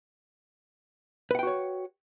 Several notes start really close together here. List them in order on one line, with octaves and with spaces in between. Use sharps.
B4 F#5 G5 F#4 C#5